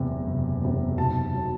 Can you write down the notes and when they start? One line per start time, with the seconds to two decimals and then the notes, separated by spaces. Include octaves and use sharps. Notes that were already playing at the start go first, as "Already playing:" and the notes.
Already playing: F#1 E2 C3
0.26 F#1
0.62 E2 C3
0.97 B1 A5
1.34 B2 F#3